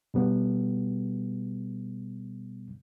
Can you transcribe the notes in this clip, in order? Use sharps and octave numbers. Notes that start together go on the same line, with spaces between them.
B2 G3 B3